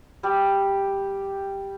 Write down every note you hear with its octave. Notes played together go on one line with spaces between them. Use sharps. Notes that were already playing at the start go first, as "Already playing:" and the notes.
G3 G4 E6